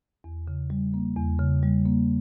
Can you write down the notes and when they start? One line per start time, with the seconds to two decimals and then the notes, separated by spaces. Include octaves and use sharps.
0.24 E2
0.48 C#3
0.70 G3
0.94 A#3
1.16 E2
1.39 C#3
1.63 G3
1.86 A#3